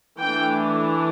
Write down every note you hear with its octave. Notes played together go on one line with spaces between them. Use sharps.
E3 A3 D4 G5